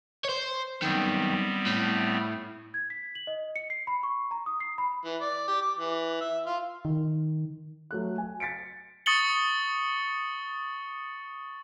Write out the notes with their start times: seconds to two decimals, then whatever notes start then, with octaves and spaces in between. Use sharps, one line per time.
0.25 C5 C#5
0.82 F#2 D#3 G3 B3 C4
1.66 A2
2.74 G#6
2.90 B6
3.15 F#7
3.27 D#5
3.56 C#7
3.70 C7
3.87 B5
4.03 C#6
4.31 A#5
4.46 D#6
4.60 C7
4.78 B5
5.05 E3
5.21 D5
5.48 G4
5.61 D6
5.77 E3
6.21 E5
6.46 F4
6.85 D#3
7.91 F#3 A3 F#6
8.18 G#5
8.40 A6 B6 C#7 D7
9.06 C#6 D#6 A6 C#7 F#7 G7